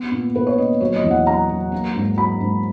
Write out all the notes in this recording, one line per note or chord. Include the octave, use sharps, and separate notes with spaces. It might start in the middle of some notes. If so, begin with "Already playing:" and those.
Already playing: B3 B4
A#2
B3 B4
C#5
A#2 D#5
F#3 C#5
D#5
E2
F#5
F#3 A#5
F#3
A#3
G#2
F#3 B5
G#2